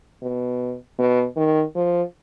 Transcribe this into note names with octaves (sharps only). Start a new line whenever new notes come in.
B2
B2
D#3
F3